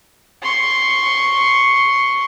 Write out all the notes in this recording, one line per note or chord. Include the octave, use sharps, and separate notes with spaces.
C6 C#6